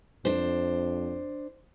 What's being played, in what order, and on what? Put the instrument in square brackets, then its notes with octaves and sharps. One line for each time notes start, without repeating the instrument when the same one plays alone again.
[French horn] F2 [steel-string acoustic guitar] D4 C5